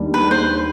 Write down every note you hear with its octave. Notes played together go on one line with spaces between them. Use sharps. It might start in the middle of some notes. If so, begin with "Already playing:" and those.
Already playing: D#2 D#3 G3 D4
B4
C5